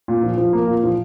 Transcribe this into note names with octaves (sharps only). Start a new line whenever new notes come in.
A#2
F3
F3
A#3
A#2
F3